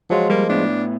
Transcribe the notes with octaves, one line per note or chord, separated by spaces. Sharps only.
F3 F#3 G#3 F4
G3 A#3
A2 B3 D4